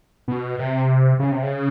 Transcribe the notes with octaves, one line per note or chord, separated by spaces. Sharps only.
B2
C3
C#3
C3
C#3